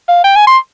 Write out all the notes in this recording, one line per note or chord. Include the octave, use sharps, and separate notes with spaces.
F5
G5
G#5
C6